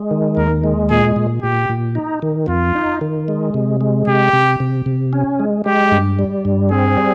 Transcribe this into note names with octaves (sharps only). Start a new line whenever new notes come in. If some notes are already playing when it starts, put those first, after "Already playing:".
Already playing: G#3
D#3
D#2 A#4
G#3
A#2 G#4
A#2
A#2 G4
A#2
D#4
D#3
F2 F4
D#4
D#3
G#3
C3
G#3
C3 G4
C3
C3
C3
C#4
G#3
G#3 G4
G2
G3
G2
C4 G#4
G3